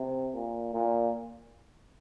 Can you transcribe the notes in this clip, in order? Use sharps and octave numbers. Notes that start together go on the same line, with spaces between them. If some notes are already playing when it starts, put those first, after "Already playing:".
Already playing: C3
A#2
A#2